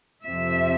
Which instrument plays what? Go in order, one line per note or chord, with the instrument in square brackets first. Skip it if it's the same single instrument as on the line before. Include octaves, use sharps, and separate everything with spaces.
[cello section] F2 C3 F3 E5